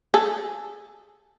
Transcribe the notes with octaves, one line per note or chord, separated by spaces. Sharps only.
G#4 A4